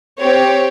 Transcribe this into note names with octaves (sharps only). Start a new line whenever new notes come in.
C4 G4 C#5